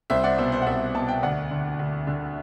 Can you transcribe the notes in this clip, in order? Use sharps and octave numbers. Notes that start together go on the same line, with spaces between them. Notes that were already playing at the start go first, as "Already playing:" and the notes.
C2 C5 E5
D5 F#5
B2 C5 E5
C5 E5
F#5
C2 C5 E5
B2 A5
G5
D2 D5 F#5
D3
D2
D3